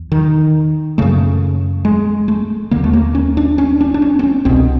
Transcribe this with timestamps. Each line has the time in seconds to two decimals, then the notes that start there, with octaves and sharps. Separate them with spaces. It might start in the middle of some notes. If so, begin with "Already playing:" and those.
Already playing: E2
0.12 D#3
0.98 F#2 C#3 A3
1.85 G#3
2.28 A3
2.71 D#2 D3 A#3
2.84 A3
2.93 A#3
3.15 C#4
3.37 D4
3.58 C#4
3.81 D4
3.94 D4
4.02 C#4
4.19 C4
4.23 C#4
4.45 C2 B2 C4